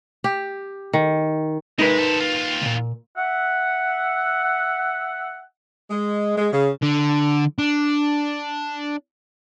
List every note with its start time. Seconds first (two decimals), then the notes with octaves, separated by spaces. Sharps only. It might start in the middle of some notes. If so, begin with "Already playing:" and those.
0.24 G4
0.93 D#3
1.79 G#3 D#4 A#4 B4
1.99 A4 C5
2.20 D#2 F4
2.62 C#2 A#2
3.17 E5 F#5
5.91 G#3
6.37 G#3
6.52 C#3
6.82 D3
7.59 D4